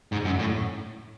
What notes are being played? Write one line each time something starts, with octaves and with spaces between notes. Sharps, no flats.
G#2
F#2
A2